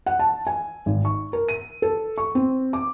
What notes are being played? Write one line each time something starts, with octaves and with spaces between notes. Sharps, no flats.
F#5
A5
G#5
G#1
C#6
A#4
D#7
A4
C#6
C4
D6